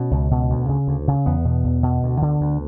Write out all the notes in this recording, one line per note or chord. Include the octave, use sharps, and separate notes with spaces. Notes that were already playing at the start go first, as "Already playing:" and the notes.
Already playing: B2 C#4
C#2
B2
D2
C#3
D2
C#3
E2 B3
B2
E2
B2
D2
D3
D2